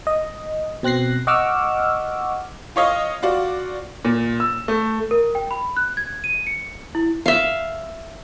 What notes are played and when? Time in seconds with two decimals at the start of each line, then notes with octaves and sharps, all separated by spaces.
0.07 D#5
0.83 B2 C4 F#6 A#6 C7
1.27 D#5 F#5 C#6 D6 E6 F6
2.76 F4 C#5 D#5 F5
3.23 F4 F#4 D5
4.05 A#2
4.40 E6
4.68 A3
5.11 A#4
5.35 G5
5.51 B5
5.77 F#6
5.97 G#6
6.24 D#7
6.47 C#7
6.95 E4
7.26 E5 F5